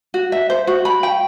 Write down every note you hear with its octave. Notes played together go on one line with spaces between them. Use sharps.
F#4
E5
C5
F#4
B5
G5